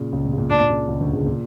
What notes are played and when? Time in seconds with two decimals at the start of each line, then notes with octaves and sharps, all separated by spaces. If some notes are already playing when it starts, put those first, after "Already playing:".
Already playing: A#2 C#3
0.12 C#2 C#3
0.26 A#2
0.33 C#3
0.38 A#2
0.50 A#2 D4
0.61 A#2
0.69 C#2 C#3
0.88 C#2 C#3
1.01 D2 D3
1.13 C#2 C#3
1.26 A#2